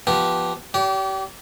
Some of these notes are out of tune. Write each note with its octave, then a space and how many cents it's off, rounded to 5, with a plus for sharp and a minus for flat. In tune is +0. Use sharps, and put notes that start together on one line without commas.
F3 +0 B3 +0 G4 -10
G4 -30 D5 -45